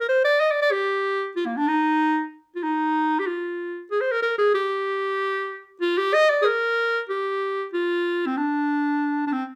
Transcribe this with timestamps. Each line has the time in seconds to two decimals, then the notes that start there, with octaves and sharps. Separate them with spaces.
0.01 A#4
0.09 C5
0.25 D5
0.40 D#5
0.51 D5
0.62 D5
0.72 G4
1.36 F4
1.46 A#3
1.57 D4
1.68 D#4
2.56 F4
2.63 D#4
3.20 G4
3.27 F4
3.91 G#4
4.01 C5
4.12 A#4
4.22 A#4
4.38 G#4
4.54 G4
5.81 F4
5.98 G4
6.14 D#5
6.30 D5
6.42 G#4
6.45 A#4
7.09 G4
7.74 F4
8.27 C4
8.37 D4
9.27 D4
9.33 C4